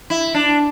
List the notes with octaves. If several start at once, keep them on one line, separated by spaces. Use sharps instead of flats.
E4
D4